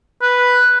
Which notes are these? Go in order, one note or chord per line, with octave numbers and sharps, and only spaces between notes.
B4